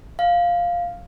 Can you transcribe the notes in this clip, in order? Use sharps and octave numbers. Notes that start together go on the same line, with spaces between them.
F5